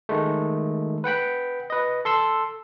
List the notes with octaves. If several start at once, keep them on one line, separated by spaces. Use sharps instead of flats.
D#3 G#3 A3
B4 F#5 G5 B5
B4 D#5
A4 C6 E6